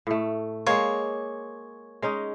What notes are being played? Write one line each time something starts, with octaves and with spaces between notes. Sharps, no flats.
A2 A3
G#3 A#3 C#5
G#3 C#4 D#4